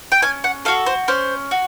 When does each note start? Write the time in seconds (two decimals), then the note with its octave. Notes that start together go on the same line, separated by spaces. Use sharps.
0.12 G5
0.22 C#4 G#5
0.44 F#5
0.65 F#4 A4 F5
0.86 C5
1.08 C#4 C5
1.51 F#4